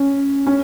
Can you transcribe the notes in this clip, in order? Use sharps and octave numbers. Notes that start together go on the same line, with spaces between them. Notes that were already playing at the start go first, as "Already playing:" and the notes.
Already playing: C#4
C#4